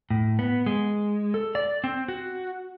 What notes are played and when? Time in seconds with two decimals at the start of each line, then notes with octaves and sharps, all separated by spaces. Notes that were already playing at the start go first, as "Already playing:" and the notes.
0.10 A2
0.39 B3
0.66 G#3
1.34 A4
1.55 D5
1.84 C4
2.08 F#4